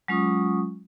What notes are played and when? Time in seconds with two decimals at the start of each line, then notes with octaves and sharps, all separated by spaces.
0.08 F#3 G#3 C#4 F4 C#6 D#6